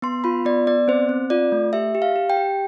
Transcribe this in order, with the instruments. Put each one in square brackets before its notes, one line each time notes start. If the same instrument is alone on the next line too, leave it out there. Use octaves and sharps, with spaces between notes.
[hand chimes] B3 C6
F4 B5
B3 D5
B3 D5
C4 C5
C4
F4 D5
A3
G4 E5
G4
F5
G4
G5
G4